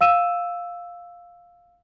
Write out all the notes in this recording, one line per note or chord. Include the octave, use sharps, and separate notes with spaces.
F5 E6 D#7 E7